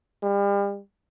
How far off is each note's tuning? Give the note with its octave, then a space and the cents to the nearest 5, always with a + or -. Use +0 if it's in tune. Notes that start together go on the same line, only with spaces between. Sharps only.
G3 +40